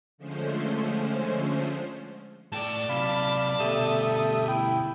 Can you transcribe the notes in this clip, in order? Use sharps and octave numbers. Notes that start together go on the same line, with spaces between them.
D3 F3 G#3 A3 C#4 C5
A2 D5 G5 A5
C3 F#3 F5 B5
D2 B2 G4 A4 E5 D#6
E4 G5